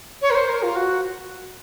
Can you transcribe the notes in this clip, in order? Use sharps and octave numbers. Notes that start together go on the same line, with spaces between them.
C#5
A#4
C5
A#4
F4
F#4